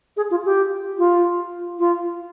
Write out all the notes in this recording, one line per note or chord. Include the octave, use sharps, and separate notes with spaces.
G#4
F4
G4
F4
F4